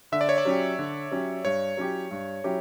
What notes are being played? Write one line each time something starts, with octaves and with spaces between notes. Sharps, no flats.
D3 E5
D5
C#5
D5
F#3 C#4 G4
D3
F#3 C#4 G4
G2 C#5
F#3 C#4 E4 G4
G2
F#3 C#4 E4 G4